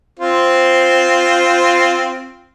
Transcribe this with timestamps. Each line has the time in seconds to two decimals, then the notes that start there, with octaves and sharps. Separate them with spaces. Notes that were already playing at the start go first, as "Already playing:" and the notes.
0.19 C4 F4 C5